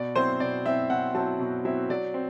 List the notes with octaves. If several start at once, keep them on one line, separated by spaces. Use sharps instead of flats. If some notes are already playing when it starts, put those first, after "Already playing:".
Already playing: B2 D5
F#3 C4 E4 C5
B2 D5
F#3 C4 E4 E5
B2 F#5
F#3 C4 E4 A5
B2
F#3 C4 E4 E5
F#3 D5
C4